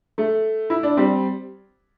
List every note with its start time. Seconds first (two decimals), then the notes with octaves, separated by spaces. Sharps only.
0.18 A3
0.70 E4
0.83 D4
0.97 G3 C4